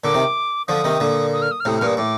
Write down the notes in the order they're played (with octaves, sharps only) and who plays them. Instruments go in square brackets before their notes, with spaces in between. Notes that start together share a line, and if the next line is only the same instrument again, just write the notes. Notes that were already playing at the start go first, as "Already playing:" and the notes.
[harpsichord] A#2 D3 [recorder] D6
[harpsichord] C3 D#3
[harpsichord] D3 F3 [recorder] D#6
[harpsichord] C3 D#3
A#2 D3
[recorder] D#6
F6
D#6
F6
[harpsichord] A2 C3 [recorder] D#6
[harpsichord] G2 A#2 [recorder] F6
[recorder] D#6
[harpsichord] A2 [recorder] D6